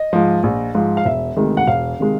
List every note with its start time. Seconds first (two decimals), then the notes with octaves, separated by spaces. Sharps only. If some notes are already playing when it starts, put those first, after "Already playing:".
Already playing: D#5
0.13 G#2 F3
0.43 A#1
0.75 G#2 F3
0.97 F5
1.05 E1 E5
1.37 D2 C3 D#3 G#3
1.57 F#5
1.67 E1 F5
2.00 C3 D#3 G#3